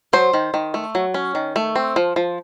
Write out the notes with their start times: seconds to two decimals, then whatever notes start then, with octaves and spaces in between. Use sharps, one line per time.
0.13 F#3 C5
0.33 D#3
0.54 D#3
0.74 A3
0.95 F#3
1.14 C#4
1.35 D#3
1.56 A3
1.76 C4
1.96 F3
2.16 F3